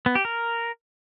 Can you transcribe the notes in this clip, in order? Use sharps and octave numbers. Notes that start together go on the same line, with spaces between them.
B3
G4
A#4